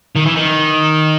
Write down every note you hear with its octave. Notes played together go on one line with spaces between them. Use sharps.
D#3
E3
D#3